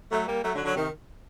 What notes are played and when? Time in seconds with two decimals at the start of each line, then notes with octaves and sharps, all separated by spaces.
0.11 F#3 A3
0.27 G3 A#3
0.43 F#3 A3
0.54 D3 F#3
0.64 D3 F#3
0.75 C3 D#3